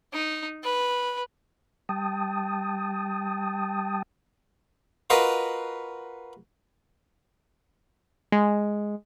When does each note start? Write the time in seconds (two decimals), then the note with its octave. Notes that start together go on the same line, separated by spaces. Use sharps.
0.13 D#4
0.63 B4
1.89 G3 G5 A5 D#6
5.10 F4 F#4 A#4 B4 D#5
8.32 G#3